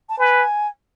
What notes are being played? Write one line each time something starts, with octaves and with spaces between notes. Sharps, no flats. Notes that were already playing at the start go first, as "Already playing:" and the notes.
A5
B4 G#5